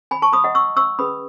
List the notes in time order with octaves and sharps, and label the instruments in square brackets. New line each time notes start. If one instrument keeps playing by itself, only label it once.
[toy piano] G#5 B5
A5 C#6
B5 D#6
D#5 F#5
C#6 E6
C#6 E6
C#4 G#4 B4 B5 D#6